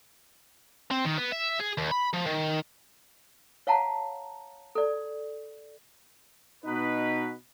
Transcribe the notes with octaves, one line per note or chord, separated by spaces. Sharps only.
C4
D#3
B3
E5
G#4
D#2
B5
F3
D#3
C#5 F5 F#5 A5 A#5
A4 D5
B2 D#4 B4